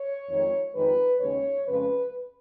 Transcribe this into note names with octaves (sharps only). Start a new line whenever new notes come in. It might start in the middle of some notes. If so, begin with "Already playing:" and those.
Already playing: C#5
F2 D#3 G#3
F2 D#3 G#3 B4
D#2 C#3 G#3 C#5
F2 C#3 F3 G#3 B4